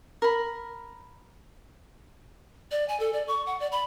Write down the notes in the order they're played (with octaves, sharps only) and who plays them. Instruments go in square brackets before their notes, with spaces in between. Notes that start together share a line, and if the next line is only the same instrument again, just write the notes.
[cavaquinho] A#4 B5
[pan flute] D5
G#5
A4
D5
C#6
F#5
D5
B5